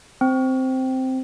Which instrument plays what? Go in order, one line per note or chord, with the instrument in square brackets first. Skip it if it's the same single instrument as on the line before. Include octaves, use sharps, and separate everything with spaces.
[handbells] C4